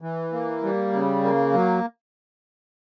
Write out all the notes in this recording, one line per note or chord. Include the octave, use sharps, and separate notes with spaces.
E3
A#3
G3
C#3
A#3
F#3